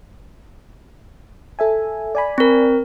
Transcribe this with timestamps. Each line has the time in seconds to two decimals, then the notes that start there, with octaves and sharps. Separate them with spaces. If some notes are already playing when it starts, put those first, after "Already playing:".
1.59 A4 E5 G#5
2.15 D5 G#5 B5
2.38 C4 A#4